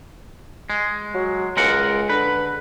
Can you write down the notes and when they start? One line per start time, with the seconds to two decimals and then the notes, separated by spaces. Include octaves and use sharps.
0.70 G#3
1.14 F#3
1.57 C#2 G#3 A#4 F#5
2.09 D3 B4